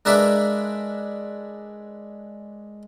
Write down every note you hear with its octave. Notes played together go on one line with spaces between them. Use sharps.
G#3 D4 A#4 B4 D5 E5